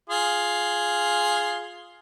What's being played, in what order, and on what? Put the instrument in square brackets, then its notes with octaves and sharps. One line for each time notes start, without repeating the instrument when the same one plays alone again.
[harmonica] F4 G#4